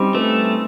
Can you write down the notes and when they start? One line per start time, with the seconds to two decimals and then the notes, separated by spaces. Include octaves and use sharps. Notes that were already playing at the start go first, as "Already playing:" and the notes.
Already playing: G3 C4 C#4 D#4
0.15 A3 B3